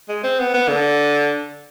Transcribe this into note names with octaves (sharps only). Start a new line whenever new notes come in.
G#3
C4
B3
B3
D3